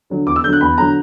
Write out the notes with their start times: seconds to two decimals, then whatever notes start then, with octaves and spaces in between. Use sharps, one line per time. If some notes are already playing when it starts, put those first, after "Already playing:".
0.10 D3 F#3
0.26 E2 D6
0.36 E6
0.43 D3 G6
0.47 F#3
0.53 F#6
0.61 E2 B5
0.78 D3 F#3 A#5